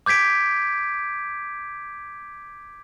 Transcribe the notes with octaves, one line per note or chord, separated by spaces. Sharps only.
D6 G6 G#6 B6 D7